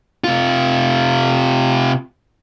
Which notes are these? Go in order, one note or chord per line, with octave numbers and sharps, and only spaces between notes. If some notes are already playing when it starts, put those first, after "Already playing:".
C3 F4